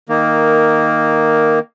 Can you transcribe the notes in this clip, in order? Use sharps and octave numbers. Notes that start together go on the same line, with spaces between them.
D#3 A#3